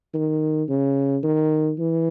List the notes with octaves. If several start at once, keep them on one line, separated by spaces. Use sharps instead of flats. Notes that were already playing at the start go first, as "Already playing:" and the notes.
D#3
C#3
D#3
E3